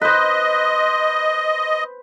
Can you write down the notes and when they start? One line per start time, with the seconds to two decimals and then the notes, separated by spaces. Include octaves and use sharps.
0.02 B4 C5 D#5